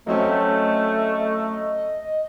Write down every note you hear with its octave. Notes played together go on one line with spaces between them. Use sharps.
F#3 A3 C4 C#4 D#5